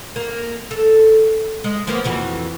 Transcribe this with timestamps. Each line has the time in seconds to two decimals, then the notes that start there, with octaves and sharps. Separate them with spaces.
0.16 A#3
0.71 A4
1.64 G#3
1.87 F3 A#3 B3
2.04 F2 E3 F#4